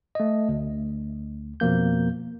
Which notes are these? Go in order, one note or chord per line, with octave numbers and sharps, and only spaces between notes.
A3 D#5
D2
F2 B2 F3 A#3 G6